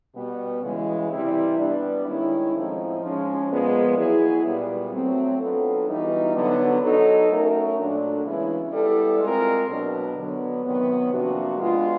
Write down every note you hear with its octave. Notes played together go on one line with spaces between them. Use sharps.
B2 G3 B3
C#3 E3 G#3
C3 E3 G3 C4 E4
G3 B3 D4
D#3 G#3 C#4 E4
A2 F3 G#3 C4 D#4
F3 G#3 C#4
A#2 F3 G#3 B3
F#3 B3 E4 G#4
A#2 G3 B3
F#3 A3 C4
F#3 B3 D4 F4 A4
E3 G3 B3 D#4 F#4
D3 F#3 B3
F#3 B3 D#4 F#4 A4
A3 C#4 F#4 A#4
A#2 F#3 A3 D4
C#3 E3 G#3 B3 E4
G3 B3 E4 A4
G#3 C4 F4 A#4
B2 F#3 B3 D4
D3 F#3 B3
C3 D#3 F#3 B3
C3 F3 A#3 D4 F#4
G#3 B3 D4 F4